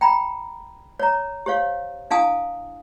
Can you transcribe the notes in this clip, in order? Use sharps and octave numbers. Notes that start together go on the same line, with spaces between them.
G5 A#5 B5
C#5 A#5
G4 C5 C#5 F5
D4 E4 F5 G#5 A5 D#6